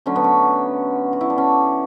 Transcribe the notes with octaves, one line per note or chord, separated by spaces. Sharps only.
D3 F#3 A3 C#4
B3
C#4
F#4
E4
D4
C#4